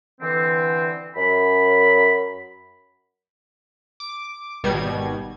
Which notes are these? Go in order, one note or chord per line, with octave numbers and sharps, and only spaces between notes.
D3 E3 C4
F#2 B5
D6
G#1 B2 G3 G#6